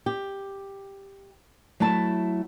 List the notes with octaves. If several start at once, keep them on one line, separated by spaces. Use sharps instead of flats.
G4
F#3 A3 E4 A5